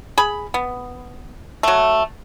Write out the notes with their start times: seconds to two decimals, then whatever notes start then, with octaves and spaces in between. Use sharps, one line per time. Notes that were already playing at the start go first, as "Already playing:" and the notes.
0.18 G#4 B5
0.54 B3
1.63 F#3 A3